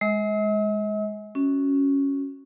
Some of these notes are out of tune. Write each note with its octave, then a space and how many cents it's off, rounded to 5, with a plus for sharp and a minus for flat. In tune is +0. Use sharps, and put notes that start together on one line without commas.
G#3 +5 D#5 +45 E6 -45
C#4 +0 F#4 +0